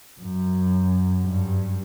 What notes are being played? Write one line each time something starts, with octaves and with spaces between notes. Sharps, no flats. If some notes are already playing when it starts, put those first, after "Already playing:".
F#2
G2